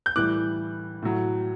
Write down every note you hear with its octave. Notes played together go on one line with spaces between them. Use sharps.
G6
A2 E3 G3 D6 F#6
A2 F#3